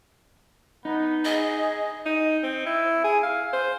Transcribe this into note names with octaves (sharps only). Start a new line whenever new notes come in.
B3 D#4
G#4 D#5
G#4
D#4
C4
E4
G#4
F5
C5